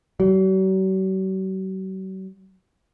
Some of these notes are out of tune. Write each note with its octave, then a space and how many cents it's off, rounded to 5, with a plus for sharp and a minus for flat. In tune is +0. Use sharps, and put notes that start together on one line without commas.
F#3 +45